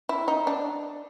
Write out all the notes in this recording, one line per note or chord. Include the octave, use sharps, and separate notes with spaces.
E4
D#4
D4